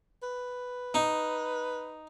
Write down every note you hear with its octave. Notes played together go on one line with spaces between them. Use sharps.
B4
D#4